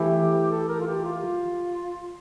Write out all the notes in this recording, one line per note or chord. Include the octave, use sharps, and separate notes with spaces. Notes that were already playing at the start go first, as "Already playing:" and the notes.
Already playing: E3 A3 E4 G4
A4
A#4
F4
G4
F4